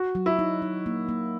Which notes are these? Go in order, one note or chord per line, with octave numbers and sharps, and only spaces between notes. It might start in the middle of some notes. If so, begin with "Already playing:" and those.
Already playing: F#4
F#3
E4
D#4
D#4
A#3
A#3